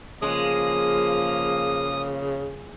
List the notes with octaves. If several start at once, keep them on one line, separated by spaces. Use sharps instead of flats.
C#3 F3 G#3 A#3 D#6